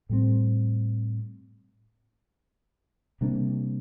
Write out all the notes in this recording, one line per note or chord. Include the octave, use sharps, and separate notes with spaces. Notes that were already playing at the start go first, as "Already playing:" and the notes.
A2 G3 C4
C3 G3 A#3 D4